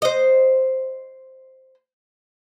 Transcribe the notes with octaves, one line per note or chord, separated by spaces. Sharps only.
C5 D#5